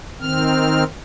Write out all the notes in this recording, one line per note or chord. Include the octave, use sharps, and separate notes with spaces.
D#3 C4 F6